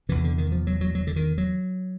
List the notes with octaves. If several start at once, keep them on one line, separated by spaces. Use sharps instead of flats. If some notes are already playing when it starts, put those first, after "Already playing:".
E2 C3 E3
D3
D#3
F3
F#3
F#3
F#3
D3
D#3
F#3